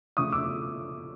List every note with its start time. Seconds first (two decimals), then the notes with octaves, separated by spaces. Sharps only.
0.17 C#3 F3 A3 C#6 D#6
0.32 D6 E6